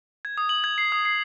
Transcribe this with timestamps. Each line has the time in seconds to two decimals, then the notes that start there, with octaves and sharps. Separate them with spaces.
0.25 G#6
0.38 D#6
0.49 F#7
0.64 G#6
0.78 C7
0.92 D#6
1.05 C7